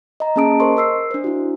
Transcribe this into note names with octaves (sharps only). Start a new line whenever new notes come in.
D#5 A#5
A#3 C#4 G#4 A5 D#6 D7
A#4 C5 D#5 C6 C#6
A#4 E6 C7
D4 C5
E4 F#4